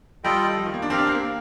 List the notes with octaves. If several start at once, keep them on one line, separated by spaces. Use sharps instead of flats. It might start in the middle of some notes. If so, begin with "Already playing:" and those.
G3 F4 A4 D#5 G5
F3
D#3
A#3
D4
C4 G4 A#4 F5
D4
C4
A#3